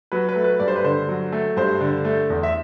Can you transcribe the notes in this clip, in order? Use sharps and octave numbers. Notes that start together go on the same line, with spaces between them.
F#3 B4
B4
A3
B4
G2 D5
C5
B4
D3 C5
F#3
A3
G2 C5
D3
A3
E2
E5